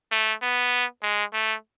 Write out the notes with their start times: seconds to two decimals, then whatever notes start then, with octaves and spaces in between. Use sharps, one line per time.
0.11 A3
0.42 B3
1.03 G#3
1.33 A3